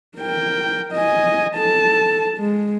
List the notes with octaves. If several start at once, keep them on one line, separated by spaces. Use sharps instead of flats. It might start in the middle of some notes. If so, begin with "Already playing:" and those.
A#4 G5
D#5 G#5
A4 A5
G#3